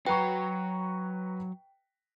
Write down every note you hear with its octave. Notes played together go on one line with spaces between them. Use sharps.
F#3 F#4 B4 G5 A#5 C#6